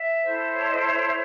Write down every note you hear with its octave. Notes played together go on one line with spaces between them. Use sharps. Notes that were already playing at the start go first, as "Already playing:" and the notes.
Already playing: E5
E4 A4 C5
C#5
D#5
C#5
C#5